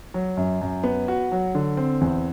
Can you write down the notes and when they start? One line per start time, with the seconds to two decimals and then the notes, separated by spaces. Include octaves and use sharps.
0.14 F#3
0.37 F#2
0.61 F#2
0.84 B3
1.08 F#4
1.32 F#3
1.55 D3
1.77 C4
2.01 E2